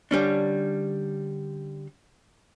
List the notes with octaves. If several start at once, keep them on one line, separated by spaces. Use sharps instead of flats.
D3 G3 C#4 D4